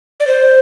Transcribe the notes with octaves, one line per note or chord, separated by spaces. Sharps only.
D5
C5